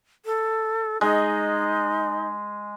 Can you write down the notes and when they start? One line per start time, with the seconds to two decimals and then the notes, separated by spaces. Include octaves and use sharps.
0.25 A4
1.01 G#3 D#4